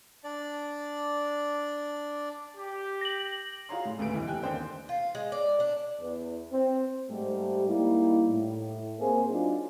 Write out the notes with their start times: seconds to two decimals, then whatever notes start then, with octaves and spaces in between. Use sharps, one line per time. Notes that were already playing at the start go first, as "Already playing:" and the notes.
0.24 D4 D5
2.55 G4
3.01 A#6 F#7
3.69 F4 F#4 G#4 C#5 A#5 C6
3.85 A2
3.98 D#1 D2 A3 B4 D7
4.14 F1 E3
4.27 G4 G5 G#5 F#6
4.43 D#2 D3 C5 G5
4.89 F4
5.15 G#3
5.32 D5
5.60 D4
6.01 E2
6.52 C4
7.10 G#2 G3 A3 G4
7.66 G3 A#3 D#4 E4
8.29 A2
8.99 A#3 C4 G#4 C5
9.30 F#3 D4 D#4 F4